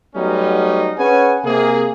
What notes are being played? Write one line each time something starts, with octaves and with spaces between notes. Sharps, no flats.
F#3 G3 A3 B3 C#4 D#4
C#4 G#4 B4 F#5 G#5
C3 A#3 G#4